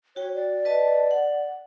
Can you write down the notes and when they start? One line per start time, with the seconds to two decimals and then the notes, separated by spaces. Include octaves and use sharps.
0.16 F#4 C#5 G5
0.35 D5
0.65 B4 D#5 A5
1.11 F#5